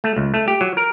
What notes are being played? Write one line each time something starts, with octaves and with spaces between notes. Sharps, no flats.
A3
C#2
A3
G4
F#3
A#4